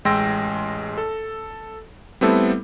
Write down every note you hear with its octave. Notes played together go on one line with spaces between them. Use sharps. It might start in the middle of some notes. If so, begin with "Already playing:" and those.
A1 G#3 G5 C6 E6 A#6
A4
G3 A3 B3 C4 E4 A4